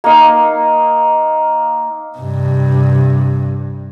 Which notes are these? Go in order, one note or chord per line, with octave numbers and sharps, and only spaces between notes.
A#3 D#4 F5
G2 C3